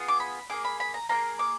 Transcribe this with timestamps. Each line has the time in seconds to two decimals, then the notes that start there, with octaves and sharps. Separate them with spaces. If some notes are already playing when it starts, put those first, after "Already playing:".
Already playing: B3 F4 G#4
0.08 D6
0.20 B5
0.50 A#3 F4 G#4 D6
0.65 B5
0.80 B5
0.94 A#5
1.09 A#3 F4 A#5
1.14 G#4
1.39 D6